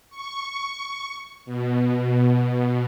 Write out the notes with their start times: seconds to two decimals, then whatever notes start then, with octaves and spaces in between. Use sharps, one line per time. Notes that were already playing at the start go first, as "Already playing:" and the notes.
0.10 C#6
1.46 B2